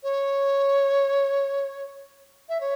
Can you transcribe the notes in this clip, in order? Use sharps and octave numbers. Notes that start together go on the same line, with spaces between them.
C#5
E5
C#5